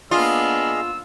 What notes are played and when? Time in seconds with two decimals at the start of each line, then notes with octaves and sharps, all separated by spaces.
0.11 A#3 B3 D4 F4 G#4 D#5 F5 E6